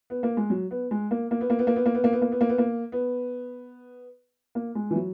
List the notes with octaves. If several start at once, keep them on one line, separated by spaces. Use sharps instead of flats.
B3
A#3
G#3
F#3
B3
G#3
A#3
A#3
B3
A#3
B3
A#3
B3
A#3
B3
A#3
B3
A#3
B3
A#3
B3
A#3
B3
A#3
G#3
E3
F#3